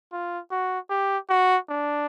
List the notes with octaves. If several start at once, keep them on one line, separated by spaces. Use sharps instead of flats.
F4
F#4
G4
F#4
D4